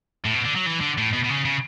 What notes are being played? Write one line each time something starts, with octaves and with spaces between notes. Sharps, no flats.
A2
B2
D3
F#3
E3
D3
A2
B2
B2
C#3
C#3